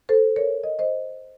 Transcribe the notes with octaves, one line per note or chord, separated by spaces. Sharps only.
A4 C5
A#4 C#5
D#5
C5 D#5